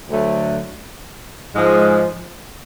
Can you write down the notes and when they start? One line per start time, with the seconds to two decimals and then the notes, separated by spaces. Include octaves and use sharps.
0.08 D2 D3 F#3 A3
1.55 G#2 F3 G#3